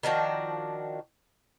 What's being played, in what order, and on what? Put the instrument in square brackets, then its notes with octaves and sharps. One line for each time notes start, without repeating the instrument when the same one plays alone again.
[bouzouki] D#3 F3 D4 F#4